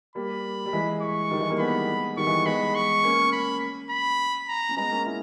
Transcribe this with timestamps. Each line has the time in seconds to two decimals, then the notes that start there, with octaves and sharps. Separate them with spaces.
0.15 G3 A#3 B5
0.66 G3
0.73 E3 G#3
1.02 C#6
1.31 D#3 G3
1.40 E3 G#3
1.50 G3 A#3
1.59 G#3 B3 B5
2.17 D#3 G3 C#6
2.27 E3 G#3
2.46 G#3 B3 B5
2.75 C#6
3.04 A#3 C#4
3.33 B5
3.90 B5
4.48 A#5
4.69 C#4
4.77 G#3 B3 A#5
4.91 A#3 C#4
5.05 C#4 E4